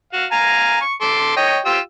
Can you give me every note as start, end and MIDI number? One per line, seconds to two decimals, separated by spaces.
0.13 0.26 66
0.13 0.26 77
0.32 0.79 77
0.32 0.79 80
0.32 0.79 82
0.81 0.93 85
1.01 1.33 69
1.01 1.33 84
1.01 1.33 86
1.37 1.58 73
1.37 1.58 75
1.37 1.58 79
1.66 1.79 65
1.66 1.79 67
1.66 1.79 88